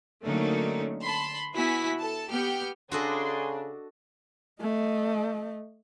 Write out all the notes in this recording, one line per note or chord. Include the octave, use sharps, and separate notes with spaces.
D3 F#3 A3 A#3 C#4 D#4
A5 B5 C6
B3 E4 F#4 E5 G#5 B6
A4 A5
B3 G4 F6 G6
C#3 D4 D#4 F#4 A4 D#5 G#5 C6
A3 D#5